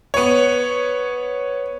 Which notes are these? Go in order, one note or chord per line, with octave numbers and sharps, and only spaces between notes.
B3 C#5